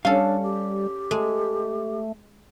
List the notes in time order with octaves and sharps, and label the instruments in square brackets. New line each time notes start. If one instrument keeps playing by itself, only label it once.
[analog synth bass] G3 [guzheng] C#4 A4 [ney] D4 [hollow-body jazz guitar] F5
[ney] G4
[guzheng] G#3 [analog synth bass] A3